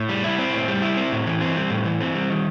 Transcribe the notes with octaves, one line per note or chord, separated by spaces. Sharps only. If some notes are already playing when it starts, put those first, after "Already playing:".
Already playing: A2
G3
E4
C4
A2
G3
E4
C4
A2
E3
C4
G3
A2
E3
C4
G3
D#3